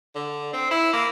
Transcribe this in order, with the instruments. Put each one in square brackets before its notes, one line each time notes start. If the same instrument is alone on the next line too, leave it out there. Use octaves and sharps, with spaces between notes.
[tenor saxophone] D3
C4
E4
A#3